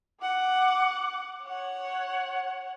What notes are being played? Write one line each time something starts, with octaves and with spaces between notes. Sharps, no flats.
F#5 D6
C#5 F#5